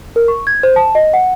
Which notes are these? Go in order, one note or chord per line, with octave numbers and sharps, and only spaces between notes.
A#4
C#6
G#6
C5
A5
D#5
F#5